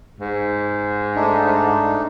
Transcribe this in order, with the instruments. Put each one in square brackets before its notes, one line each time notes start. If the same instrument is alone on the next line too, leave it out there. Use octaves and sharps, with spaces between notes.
[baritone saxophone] G#2
[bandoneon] A3 D4 D#4